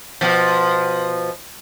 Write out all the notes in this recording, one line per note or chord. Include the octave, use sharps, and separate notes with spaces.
B2 F3